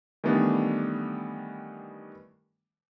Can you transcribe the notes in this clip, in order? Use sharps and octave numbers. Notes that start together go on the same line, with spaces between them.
D#3 E3 G3 A3 B3 D4